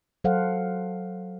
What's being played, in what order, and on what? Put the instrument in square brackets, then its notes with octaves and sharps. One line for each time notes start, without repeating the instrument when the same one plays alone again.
[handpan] F#3 A4 C5 F5 F#5